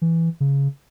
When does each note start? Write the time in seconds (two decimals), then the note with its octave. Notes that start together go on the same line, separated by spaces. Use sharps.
0.02 E3
0.40 C#3